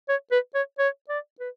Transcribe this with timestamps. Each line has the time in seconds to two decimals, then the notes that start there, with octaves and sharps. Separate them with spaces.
0.09 C#5
0.32 B4
0.55 C#5
0.79 C#5
1.09 D5
1.40 B4